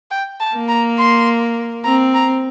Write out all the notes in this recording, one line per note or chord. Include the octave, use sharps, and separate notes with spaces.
G5
A5
A#3
A#5
C6
C4 A#5
A#5